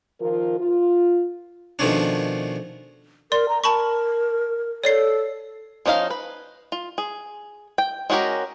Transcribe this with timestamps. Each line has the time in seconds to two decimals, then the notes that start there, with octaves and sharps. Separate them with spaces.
0.20 D#3 F3 F4 A#4
0.59 F4
1.79 B2 D#3 F3 A3 C#4 D4
3.32 A#4 D5 C6
3.49 A#5
3.64 A#4 A5 B5 C#6
4.84 A4 C#5 D5 C7
5.86 F3 C#4 D#4 F#4 F5
6.10 B4
6.72 F4
6.98 G#4
7.78 G5
8.10 G#3 C#4 F#4 G4 A#4